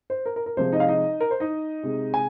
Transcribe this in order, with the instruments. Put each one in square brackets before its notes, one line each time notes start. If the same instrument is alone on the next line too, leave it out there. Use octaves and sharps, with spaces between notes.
[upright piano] C5
A#4
A#4
A#4
C3 F3 G#3 C5
D#4 D#5
F5
D#4 D#5
A#4
C5
D#4 D#5
C3 G#3
G#5